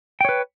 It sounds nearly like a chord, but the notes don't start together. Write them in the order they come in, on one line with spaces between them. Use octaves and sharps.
G5 C#5 B4